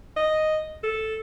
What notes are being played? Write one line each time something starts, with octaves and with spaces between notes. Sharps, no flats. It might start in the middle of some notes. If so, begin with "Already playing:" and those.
D#5
A4